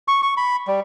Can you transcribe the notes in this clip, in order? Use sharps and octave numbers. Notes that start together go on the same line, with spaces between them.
C#6
C#6
B5
G3